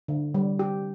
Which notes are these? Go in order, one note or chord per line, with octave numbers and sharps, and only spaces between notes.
D3
G3
G4